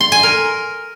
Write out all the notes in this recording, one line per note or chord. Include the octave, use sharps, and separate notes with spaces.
C6
G#5
A#4